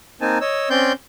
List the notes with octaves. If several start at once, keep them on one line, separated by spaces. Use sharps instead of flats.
A#3 C4 D#4 G#5 A5
C#5 D#5 E6
C4 C#4 D5 C6 G6